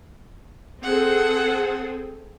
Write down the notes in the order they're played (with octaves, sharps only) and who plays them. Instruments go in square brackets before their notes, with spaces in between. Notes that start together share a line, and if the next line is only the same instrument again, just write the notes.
[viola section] C4 G#4 A4 [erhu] F#5